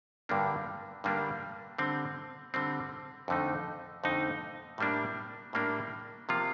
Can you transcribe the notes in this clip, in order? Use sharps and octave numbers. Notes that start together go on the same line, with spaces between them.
G2 D3 G3 A#3 D4
G2 D3 G3 A#3 D4
D3 G3 C4
D3 G3 C4
F2 D3 A3 D#4
F2 D3 A3 D#4
A2 G3 A#3 D4
A2 G3 A#3 D4
C3 F3 A#3 F4